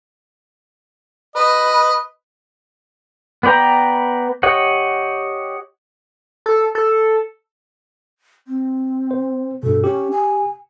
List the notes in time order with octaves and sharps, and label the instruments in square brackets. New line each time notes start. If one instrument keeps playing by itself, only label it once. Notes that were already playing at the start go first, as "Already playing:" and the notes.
[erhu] B4 [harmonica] D#5
[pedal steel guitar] B3 B4 D5 G5 A#5
G4 C#5 D#5 F#5
[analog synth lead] A4
A4
[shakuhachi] C4
[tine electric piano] C5
[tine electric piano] G2 B2 [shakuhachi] A4
[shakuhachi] C#4 [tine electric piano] G4
[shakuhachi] G#5